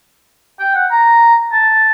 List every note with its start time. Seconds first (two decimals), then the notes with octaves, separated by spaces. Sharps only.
0.59 G5
0.75 F#5
0.91 A#5
1.52 A5